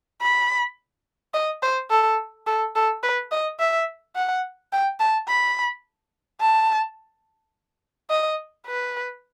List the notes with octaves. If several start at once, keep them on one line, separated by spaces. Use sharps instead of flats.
B5
D#5
C5
A4
A4
A4
B4
D#5
E5
F#5
G5
A5
B5
A5
D#5
B4